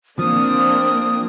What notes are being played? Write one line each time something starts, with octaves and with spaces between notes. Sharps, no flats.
F3 A#3 C4 D4 D#6